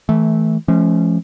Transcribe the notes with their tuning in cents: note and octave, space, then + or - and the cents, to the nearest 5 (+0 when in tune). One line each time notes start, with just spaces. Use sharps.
E3 -20 A3 -10
F3 -35 A3 -45 C#4 -10